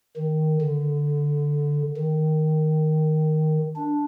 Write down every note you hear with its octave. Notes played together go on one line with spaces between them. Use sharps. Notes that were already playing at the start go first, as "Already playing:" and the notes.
D#3
D3
D#3
D4